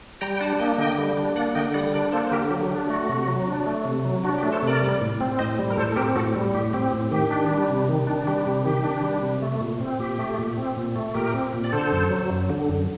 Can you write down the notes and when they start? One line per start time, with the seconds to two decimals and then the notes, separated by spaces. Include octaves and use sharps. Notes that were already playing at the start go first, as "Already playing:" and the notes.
0.21 G3 G5 A#5
0.31 G5
0.40 D4 F#5 A5
0.59 A#3 D#5 G5
0.78 D3 D#5 G5
0.98 G3
1.17 D4
1.36 A#3 D5 F#5
1.55 D3 D#5 G5
1.74 G3 D5 F#5
1.93 D4 A#4 D5
2.12 A#3 A4 C5
2.27 C5
2.31 D3 G4 A#4
2.51 F#3 G4
2.70 D4 G4
2.89 A3 F#4
3.09 C3
3.27 F#3
3.47 D4
3.66 A3
3.85 C3
4.05 F#3
4.24 D4 F#4
4.38 G4
4.43 A3
4.52 A4 C5
4.63 C3 A#4 D5
4.82 G3
5.01 A2
5.21 C4
5.39 A2 C5 D#5
5.59 G3
5.70 A#4
5.77 A2 A4 C5
5.92 A4
5.96 C4 G4 A#4
6.16 A2 F#4 A4
6.36 G3
6.54 A2 G4
6.73 C4 G4
6.93 A2
7.11 D#3 G4
7.31 D4
7.51 G3
7.69 C3
7.89 D#3
8.07 D4
8.27 G3 G4
8.46 C3 G4
8.65 D#3 G4
8.84 D4
9.03 G3
9.23 C3
9.42 A3
9.61 A#2
9.81 C4
9.99 A#2 G4
10.19 A3
10.39 A#2
10.57 C4
10.77 A#2
10.96 A3
11.15 A#2 G4 A#4
11.34 C4
11.54 A#2
11.64 D5
11.72 D3 A4 C5
11.92 F#2
12.10 F#3
12.30 F#2
12.50 D3
12.68 F#2